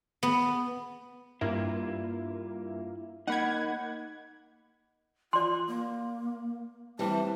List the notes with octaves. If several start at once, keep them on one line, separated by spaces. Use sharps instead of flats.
B3
G2 A#3 E4 F4
A#3 D#4 F#5 B5 G#6
F4 D5 C6
A#3
E3 G3 C4 A5